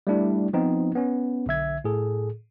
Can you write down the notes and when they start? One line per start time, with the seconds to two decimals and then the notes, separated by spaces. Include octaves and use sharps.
0.07 G3 A3 D4 E4
0.53 F3 B3 C4 D#4
0.95 B3 C#4
1.46 B1 D3 E5 G#6
1.84 A2 G#4 A4